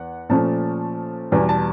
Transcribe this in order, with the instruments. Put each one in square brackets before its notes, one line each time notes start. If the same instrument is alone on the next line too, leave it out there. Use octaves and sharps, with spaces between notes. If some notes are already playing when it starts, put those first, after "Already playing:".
Already playing: [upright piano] E2 F#5
A#2 F3 A3 C#4 A5
E2 B2 G3 G#5
A5